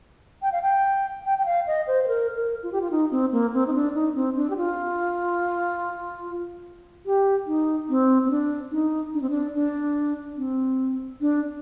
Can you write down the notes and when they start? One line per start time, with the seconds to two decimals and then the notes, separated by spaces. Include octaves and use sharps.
0.42 G5
0.52 F5
0.62 G5
1.25 G5
1.38 G5
1.45 F5
1.67 D#5
1.87 C5
2.04 C5
2.08 A#4
2.35 A#4
2.63 F4
2.72 G4
2.81 F4
2.91 D#4
3.11 C4
3.32 A#3
3.54 C4
3.67 D#4
3.74 D4
3.95 D#4
4.15 C4
4.36 D4
4.50 G4
4.57 F4
7.06 G4
7.47 D#4
7.89 C4
8.25 C4
8.30 D4
8.71 D#4
9.14 D4
9.21 C4
9.30 D4
9.55 D4
10.37 C4
11.21 D4